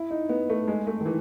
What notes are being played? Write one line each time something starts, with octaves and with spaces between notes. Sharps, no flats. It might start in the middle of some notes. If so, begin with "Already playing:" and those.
Already playing: E4
D#4
B3
A3
G#3
A3
D#3
E3